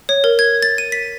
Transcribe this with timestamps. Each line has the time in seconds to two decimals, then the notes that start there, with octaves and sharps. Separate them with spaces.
0.09 C#5
0.24 A#4
0.39 G#6
0.62 A6
0.78 D#7
0.92 B6